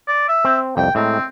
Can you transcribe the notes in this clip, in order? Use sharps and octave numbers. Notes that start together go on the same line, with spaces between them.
D5
E5
C4
C2 F2 G5
A2 G#3 C4 A#5